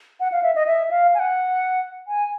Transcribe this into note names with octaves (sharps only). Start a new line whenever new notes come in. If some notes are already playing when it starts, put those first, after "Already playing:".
F#5
F5
E5
D#5
E5
F5
G#5
F#5
G#5